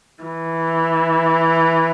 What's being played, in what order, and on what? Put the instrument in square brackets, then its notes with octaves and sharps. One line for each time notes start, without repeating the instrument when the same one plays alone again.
[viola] E3